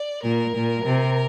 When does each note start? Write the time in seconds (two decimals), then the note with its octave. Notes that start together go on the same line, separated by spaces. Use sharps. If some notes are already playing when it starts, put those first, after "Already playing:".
Already playing: D5
0.23 A#2 A#4
0.54 A#2
0.85 C3